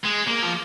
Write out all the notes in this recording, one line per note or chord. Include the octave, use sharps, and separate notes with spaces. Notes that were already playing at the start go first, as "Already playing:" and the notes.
G#3
A#3
F3